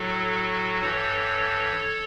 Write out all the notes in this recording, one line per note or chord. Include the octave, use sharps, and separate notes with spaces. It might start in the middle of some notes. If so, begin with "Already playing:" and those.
Already playing: A2 F#3 F#4 A4
G2 E3 A4 C#5